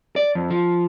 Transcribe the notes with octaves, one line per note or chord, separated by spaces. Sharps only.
D5
F2
F3